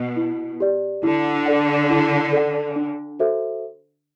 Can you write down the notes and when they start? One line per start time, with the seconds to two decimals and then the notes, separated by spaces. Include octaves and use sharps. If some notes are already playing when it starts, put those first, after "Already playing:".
Already playing: B2
0.16 E4
0.60 G4 D5
1.03 D3 E4
1.46 A4 D5 F#5
1.90 E4
2.33 A4 D5 F#5
2.76 D4
3.19 F#4 A4 C5 E5